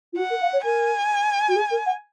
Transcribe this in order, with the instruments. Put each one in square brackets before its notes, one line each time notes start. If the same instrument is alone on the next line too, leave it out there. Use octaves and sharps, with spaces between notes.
[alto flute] F4
[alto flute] F#4 [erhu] F#5
[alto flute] A#4
F5
C#5
[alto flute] A#4 [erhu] G#5
[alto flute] F#4
G#4
A#4
F#5